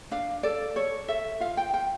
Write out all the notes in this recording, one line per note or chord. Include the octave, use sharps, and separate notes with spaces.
D4 F5
A4 D5
A4 C#5
A4 E5
F4 F5
G5
F4 G5